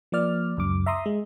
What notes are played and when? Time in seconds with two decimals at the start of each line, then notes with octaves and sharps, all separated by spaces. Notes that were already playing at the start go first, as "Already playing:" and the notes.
0.12 F3 A#3 D5 F6
0.57 C#2 F#2 D6
0.86 E5 A#5 C6 D#6
1.06 G#3